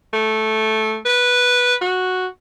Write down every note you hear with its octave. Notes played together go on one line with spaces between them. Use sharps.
A3
B4
F#4